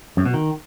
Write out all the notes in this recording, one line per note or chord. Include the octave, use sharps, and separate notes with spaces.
F#2
B2
D#3